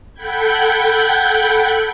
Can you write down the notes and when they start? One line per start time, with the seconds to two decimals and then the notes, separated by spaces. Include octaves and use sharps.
0.14 A4 F#5 G5 B5 G6 G#6